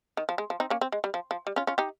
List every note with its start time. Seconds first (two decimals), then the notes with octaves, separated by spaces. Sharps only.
0.17 D#3
0.29 F3
0.38 G#3
0.50 F3
0.60 C4 D#4
0.70 A#3 C#4
0.81 C4
0.92 G#3
1.04 G3
1.14 F3
1.31 F3
1.47 G3
1.56 C#4 F4
1.67 C#4 F4
1.78 D#4 G4